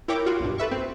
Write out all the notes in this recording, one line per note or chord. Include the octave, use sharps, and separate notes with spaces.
E4 A#4 C#5 G5 D6
F4 F#4
B1 G2
A4 B4 E5 C#6
C4